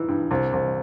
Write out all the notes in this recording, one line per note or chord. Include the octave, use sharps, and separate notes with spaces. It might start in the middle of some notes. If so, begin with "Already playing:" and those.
Already playing: E3 D#4
G2
C2
C2